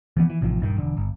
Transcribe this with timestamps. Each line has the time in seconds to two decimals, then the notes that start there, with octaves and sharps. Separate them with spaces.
0.17 E3 F3 B3
0.30 E3
0.41 A1 C3 D#3 F3
0.60 D#1 G2 D#3
0.76 E1 D3
0.97 G1